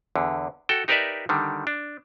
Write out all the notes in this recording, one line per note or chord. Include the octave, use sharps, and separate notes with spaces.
E2 D3
F#4 A4 G5
D#4 G4 A#4 B4 D5 E5
D3 D#3 G3
D4